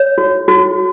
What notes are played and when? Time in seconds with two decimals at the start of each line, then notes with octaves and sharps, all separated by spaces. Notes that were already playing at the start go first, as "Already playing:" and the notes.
Already playing: C#5
0.18 F#4
0.48 F#4